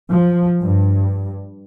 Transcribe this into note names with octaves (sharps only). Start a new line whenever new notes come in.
F3
G2